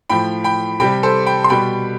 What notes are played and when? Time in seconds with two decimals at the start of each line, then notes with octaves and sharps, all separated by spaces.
0.10 A2 F3 G5 B5
0.44 G5 B5
0.80 C3 G3 G5 B5
1.03 A4 C5
1.26 G5 B5
1.44 C6
1.50 B2 G3 G5 B5